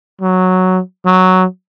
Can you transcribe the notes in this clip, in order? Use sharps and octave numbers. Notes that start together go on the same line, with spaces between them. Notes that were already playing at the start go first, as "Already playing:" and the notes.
F#3
F#3